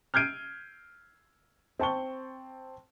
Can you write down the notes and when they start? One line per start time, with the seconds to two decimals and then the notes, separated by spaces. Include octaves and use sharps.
0.14 F6 G6 G#6 C7 D7 D#7
1.79 C4 A5 C#6 G7